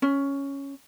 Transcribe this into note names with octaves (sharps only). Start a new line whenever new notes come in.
C#4